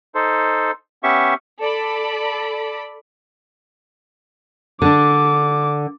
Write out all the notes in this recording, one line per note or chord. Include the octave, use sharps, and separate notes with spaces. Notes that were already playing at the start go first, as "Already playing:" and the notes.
D#4 A4 C5
B3 C#4 G4 E5 C#6
A4 D5 B5
D3 D4 D6